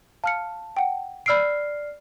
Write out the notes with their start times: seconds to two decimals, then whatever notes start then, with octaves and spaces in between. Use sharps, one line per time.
0.24 F5 A5 F6 C#7
0.77 F#5 G5
1.26 D5 B5 E6 F6 C7 D7